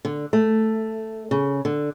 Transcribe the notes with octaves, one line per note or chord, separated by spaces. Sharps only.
D3
A3
C#3
D3